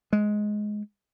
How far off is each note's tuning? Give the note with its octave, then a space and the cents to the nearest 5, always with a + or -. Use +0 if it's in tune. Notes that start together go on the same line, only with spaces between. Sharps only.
G#3 +10